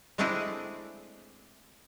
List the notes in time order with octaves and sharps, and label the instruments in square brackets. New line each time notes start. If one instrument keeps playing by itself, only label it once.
[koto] G#3 A3 C4 D4 E4 G#4